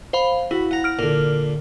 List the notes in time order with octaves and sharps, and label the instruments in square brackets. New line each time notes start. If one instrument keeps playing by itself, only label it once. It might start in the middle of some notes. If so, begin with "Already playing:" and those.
[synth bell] C5 F5 B5
[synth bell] E4 [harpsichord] F#4
[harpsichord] F#5 A#5
[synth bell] F6 D7
[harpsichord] A#2 D3 [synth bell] A#4